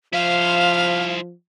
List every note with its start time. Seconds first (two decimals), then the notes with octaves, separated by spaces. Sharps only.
0.13 F3 E4 C5 F5